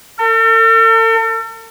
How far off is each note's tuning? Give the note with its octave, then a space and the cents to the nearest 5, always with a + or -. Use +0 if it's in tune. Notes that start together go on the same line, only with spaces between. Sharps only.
A4 +45